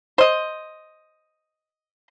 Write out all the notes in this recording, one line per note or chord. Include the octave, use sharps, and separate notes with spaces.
C5 D#5